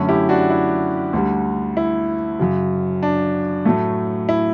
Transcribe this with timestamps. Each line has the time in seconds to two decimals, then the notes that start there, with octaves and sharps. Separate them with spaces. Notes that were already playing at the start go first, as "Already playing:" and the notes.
Already playing: F#2 D3 A3 C#4
0.09 E4 G4
0.29 D4 F#4
0.50 E4
1.13 D2 D3 G3
1.77 E4
2.39 F#2 C#3 F#3
3.03 D4
3.65 A2 F#3 A3
4.29 E4